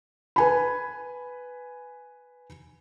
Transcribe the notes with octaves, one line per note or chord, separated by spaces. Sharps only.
B4 G#5 B5